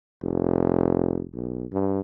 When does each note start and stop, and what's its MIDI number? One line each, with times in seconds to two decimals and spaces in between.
0.22 1.23 29
1.34 1.65 35
1.73 2.01 43